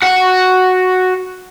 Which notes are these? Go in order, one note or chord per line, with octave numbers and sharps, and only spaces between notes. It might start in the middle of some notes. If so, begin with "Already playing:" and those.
F#4 F#5